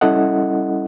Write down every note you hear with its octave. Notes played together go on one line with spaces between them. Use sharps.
G3 C#4 E4 A4 D#5 F#5